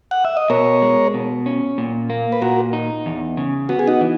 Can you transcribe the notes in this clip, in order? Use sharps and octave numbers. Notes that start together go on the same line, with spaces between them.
F#5
E5
D#5
B2 A#4 C#5
G#3
B2
C#4
A#2
A#3
B4
A#2 F#4 A#4
D#4
E2
C#3
B3 F#4
G#4
D#4 F#4
E3